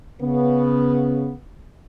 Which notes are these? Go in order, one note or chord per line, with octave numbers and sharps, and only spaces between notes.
C#3 B3